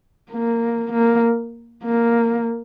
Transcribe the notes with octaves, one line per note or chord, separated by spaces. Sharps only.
A#3
A#3
A#3